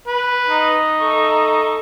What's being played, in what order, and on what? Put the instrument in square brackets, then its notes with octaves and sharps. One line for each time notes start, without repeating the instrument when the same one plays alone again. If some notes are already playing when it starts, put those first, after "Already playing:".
[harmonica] B4
[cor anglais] D#4
[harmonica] A4 C#6